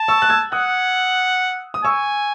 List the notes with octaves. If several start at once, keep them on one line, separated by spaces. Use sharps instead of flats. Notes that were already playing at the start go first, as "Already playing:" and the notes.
Already playing: A5
C#6 E6
F#6
E6 G#6
F#5 D#6 F#6
D#6
G#5 C#6 E6